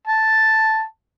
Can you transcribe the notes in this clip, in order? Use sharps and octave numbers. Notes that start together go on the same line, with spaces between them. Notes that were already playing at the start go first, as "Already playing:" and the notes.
A5